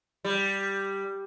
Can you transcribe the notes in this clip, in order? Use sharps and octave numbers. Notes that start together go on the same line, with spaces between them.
G3